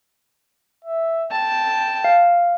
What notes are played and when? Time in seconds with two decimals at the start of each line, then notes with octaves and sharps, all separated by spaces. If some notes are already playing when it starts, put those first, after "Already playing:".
0.85 E5
1.31 G5 A5
2.05 F5